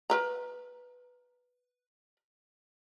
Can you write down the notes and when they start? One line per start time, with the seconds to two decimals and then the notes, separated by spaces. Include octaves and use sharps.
0.10 A#4 B4 A#5